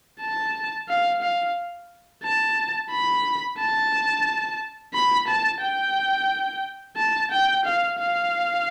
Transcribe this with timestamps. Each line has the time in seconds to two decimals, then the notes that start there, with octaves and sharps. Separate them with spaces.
0.21 A5
0.89 F5
1.22 F5
2.23 A5
2.91 B5
3.59 A5
4.94 B5
5.28 A5
5.61 G5
6.97 A5
7.31 G5
7.65 F5
7.99 F5